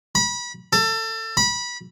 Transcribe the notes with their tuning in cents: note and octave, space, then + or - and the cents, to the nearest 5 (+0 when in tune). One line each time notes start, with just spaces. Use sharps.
B5 -30
A4 +25
B5 -25